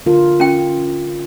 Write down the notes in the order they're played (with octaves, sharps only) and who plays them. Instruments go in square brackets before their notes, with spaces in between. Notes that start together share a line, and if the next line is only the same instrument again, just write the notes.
[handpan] D3 F4 A#4
[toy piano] C#4 G5